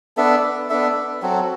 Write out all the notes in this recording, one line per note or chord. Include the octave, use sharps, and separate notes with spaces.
B3 D4 A4 E5
B3 D4 A4 E5
F#3 C4 F#4 A4